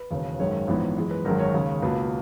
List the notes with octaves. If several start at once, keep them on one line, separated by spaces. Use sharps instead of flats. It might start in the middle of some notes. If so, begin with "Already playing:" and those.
Already playing: B4
E1 D#2 C#3
G#1 F#2 D#3 G#3 C#5
A#1 G#2 E3 B3
F#2 E3 G#3
B4
G#1 F#2 D#3 G#3 A#4
C#5
D#2 C#3 G#3
C#2 B2 A#3 B4